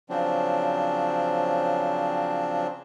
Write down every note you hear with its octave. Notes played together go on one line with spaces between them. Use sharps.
C#3 F3 F#3 C4 D4